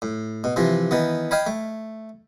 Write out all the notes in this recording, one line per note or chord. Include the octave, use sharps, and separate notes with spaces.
A2
B2
C3 E3 F3
D#3 E3 B3
D#5 F5 G5 G#5 B5
A3